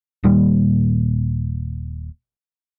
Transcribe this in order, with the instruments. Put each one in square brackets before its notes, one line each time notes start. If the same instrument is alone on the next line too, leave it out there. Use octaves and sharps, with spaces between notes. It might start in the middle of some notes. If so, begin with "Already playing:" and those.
[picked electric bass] D#1 D#2 A#2 G3